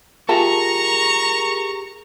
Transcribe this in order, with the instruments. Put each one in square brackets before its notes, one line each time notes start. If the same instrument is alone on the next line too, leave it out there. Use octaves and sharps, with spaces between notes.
[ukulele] F4 E5 A5 [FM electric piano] G4 G#4 A#4 [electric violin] A#5 [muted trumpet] C#6